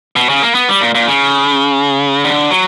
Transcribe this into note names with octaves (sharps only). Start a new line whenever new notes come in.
B2
C#3
A#3
B3
G3
A#2
A#2
C#3
D3
F#3